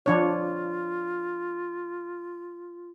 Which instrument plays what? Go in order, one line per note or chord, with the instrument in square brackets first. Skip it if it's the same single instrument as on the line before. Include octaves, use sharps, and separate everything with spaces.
[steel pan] F3 D4 C#5 [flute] F4